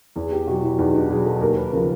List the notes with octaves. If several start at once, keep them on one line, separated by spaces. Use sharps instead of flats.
E2 G#4
G4
B2 F#3 F#4
E4
E2 D#4
D4
B2 F#3 G#4
A4
D#2 A#4
B4
C#3 F3 A#4